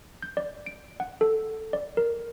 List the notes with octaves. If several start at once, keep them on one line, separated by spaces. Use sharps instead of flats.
G6
D5
D7
F#5
A4
D5
A#4